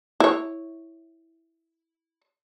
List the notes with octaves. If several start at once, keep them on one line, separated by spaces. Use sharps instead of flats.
E4 C#5